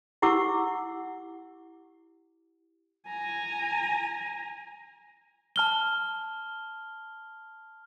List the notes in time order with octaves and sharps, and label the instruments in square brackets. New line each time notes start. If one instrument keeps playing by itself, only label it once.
[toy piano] E4 G4 F#5 D6 E6
[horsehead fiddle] G#5 A#5
[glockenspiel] A5 F6 G7